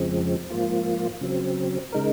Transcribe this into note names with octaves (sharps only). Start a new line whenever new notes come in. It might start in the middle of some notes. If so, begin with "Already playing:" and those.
Already playing: F2 C#3 F3 G#3 C4
G#2 F3 A#3 F4
C#3 F#3 C4
C#3 G#3 D#4 A#4